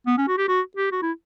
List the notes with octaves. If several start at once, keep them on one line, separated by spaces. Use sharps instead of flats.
B3
C#4
F#4
G4
F#4
G4
F#4
E4